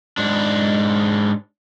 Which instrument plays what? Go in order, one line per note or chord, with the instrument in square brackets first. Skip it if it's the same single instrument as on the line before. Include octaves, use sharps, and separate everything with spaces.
[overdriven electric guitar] G#2 D4